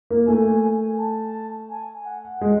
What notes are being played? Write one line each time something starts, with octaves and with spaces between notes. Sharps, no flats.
A#3
A3 G#5
G#5
A5
G#5
F#5
G#3